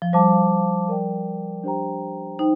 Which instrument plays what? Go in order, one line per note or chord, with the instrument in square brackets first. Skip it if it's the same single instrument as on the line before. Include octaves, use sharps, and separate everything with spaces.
[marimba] F3
[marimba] G3 [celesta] C5 F5 A5 D6
[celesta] A#4 D5 G5
D4 G4 C5 G5 A#5
[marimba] D#4 [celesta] C5 G5